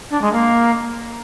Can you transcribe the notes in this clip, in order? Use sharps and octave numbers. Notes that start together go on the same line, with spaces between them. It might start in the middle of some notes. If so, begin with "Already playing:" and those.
D4
G#3
A#3